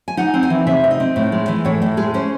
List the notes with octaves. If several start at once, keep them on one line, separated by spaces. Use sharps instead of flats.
G#5
D#4 F#5
C4
G#5
E3
C3 E5
D#4
D#5
C4
A2
G#3
E3
A2 C#5
A2
G#3 G#4
C#4 C5